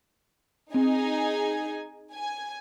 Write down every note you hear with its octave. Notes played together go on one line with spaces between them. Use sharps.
C4 D#4 G#4 G#5
G#5